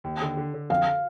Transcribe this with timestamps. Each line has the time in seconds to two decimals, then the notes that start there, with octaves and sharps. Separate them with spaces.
0.04 D#2
0.21 D3
0.37 D3
0.54 D3
0.70 F2 F5